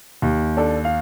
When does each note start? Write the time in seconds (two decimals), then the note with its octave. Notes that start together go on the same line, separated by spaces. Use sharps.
0.22 D#2
0.57 D4 A4
0.85 F5